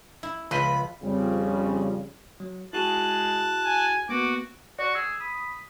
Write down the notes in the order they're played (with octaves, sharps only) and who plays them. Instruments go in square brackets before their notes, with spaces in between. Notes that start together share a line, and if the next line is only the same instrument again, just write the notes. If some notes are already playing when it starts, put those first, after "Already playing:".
[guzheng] E4
[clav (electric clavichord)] C#2 B4 [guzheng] F3 [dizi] B5
[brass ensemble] F2 C#3 F3 G3
[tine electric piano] F#3
[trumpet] G#3 [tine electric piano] E4 F#4 G#4 [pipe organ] A5 F#6
[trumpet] G#5
[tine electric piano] A#3 B3 [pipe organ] F#4 [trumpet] D6
[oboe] F#4 [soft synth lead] D5
[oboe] G#4 [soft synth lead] E6
[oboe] B5 [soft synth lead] D#6